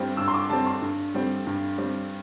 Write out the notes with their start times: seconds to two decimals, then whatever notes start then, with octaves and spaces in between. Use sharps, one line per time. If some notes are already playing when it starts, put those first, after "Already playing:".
Already playing: G2 G3 C4
0.17 G2 E6
0.28 C6
0.34 D6
0.50 G3 C4 A5
0.66 C6
0.82 G2
1.14 G3 C4
1.47 G2
1.78 G3 C4